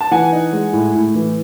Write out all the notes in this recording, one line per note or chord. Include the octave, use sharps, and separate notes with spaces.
A5
E3 F#5 G#5
D#4
G#3
A2
A2
E3